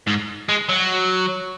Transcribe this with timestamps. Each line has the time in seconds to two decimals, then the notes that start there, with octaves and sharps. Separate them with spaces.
0.07 G#2
0.49 G#3
0.69 F#3